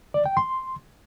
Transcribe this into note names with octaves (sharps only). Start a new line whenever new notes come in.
D5
G5
C6